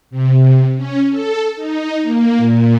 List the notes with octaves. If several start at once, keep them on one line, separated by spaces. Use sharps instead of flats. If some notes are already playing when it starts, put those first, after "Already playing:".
C3
C#4
A4
D#4
A#3
A#2